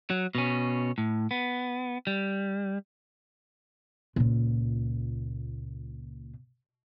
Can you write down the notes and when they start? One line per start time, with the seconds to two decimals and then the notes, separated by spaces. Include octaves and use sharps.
0.10 F#3
0.35 B2 C#4
0.98 A2
1.31 B3
2.07 G3
4.16 C#2 A#2